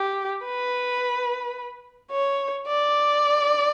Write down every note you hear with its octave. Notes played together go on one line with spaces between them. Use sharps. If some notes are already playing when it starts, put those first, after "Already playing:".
Already playing: G4
B4
C#5
D5